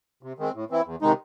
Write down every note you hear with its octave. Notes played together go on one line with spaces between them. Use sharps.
C3
D#3 G#3 C4
A2
E3 C4 E4
E2
C3 D#3 G#3 D#4